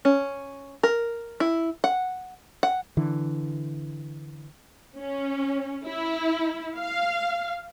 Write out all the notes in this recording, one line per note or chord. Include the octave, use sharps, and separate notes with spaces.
C#4
A#4
E4
F#5
F#5
D3 E3
C#4
E4
F5